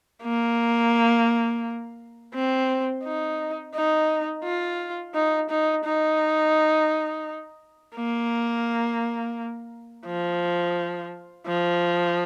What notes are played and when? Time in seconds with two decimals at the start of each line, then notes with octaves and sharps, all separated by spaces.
0.23 A#3
2.34 C4
3.04 D#4
3.75 D#4
4.44 F4
5.14 D#4
5.50 D#4
5.84 D#4
7.95 A#3
10.06 F3
11.47 F3